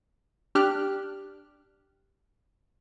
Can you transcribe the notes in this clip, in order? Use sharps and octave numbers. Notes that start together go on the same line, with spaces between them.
D4 G4 F6 F#6